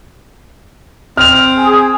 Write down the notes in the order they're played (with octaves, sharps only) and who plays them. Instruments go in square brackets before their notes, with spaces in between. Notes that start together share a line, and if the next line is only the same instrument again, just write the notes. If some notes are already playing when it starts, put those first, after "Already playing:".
[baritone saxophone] C4 [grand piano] F6 F7
[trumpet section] G#4